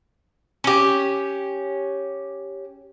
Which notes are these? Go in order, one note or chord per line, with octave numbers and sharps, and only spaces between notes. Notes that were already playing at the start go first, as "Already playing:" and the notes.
C#4 G4